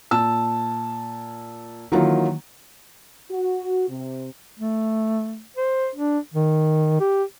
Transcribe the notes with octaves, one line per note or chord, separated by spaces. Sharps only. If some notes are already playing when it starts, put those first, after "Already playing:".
A#2 A5 E6
D#3 E3 F#3 A#3 F4
F#4
C3
A3
C5
D4
D#3
G4